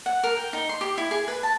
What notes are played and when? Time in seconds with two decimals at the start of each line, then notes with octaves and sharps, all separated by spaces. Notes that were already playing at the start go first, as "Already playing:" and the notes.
0.06 F#5
0.23 A#4
0.37 G5
0.53 D#4
0.69 C6
0.81 G4
0.98 E4
1.11 G#4
1.28 B4
1.43 A5